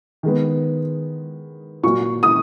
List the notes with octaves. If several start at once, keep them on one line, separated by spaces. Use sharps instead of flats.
D#3 G#3 B3
A#2 F#3 A#3 C#6
D#6